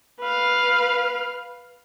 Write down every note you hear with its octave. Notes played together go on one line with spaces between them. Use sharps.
B4 F5